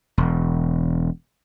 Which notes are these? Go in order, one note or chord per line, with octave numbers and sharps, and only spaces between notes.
E1